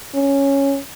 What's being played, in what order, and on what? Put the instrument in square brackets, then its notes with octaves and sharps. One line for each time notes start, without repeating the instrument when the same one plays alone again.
[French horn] C#4